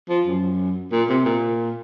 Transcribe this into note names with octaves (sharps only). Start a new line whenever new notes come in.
F3
F#2
A#2
C3
A#2